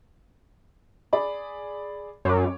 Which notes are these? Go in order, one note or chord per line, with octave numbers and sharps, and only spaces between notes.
G#4 D5 B5
F#2 C#5 D6